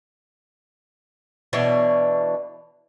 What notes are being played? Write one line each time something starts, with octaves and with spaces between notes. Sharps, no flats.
B2 E3 D4 C#5